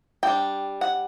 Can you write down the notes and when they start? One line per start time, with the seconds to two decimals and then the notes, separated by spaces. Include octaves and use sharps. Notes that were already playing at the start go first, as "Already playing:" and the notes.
0.23 G3 D4 G5
0.81 F#5